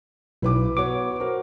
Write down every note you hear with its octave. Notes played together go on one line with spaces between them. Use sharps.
B1 E4 B4 D6
B3 F#4 C#5 D6
F#4 A#4 C5